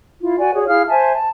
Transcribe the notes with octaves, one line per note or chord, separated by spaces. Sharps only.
E4 F4
F#4 D5 G#5
F#4 G#4 C#5
E4 G#4 F5 F6
C5 E5 G#5 A5
A5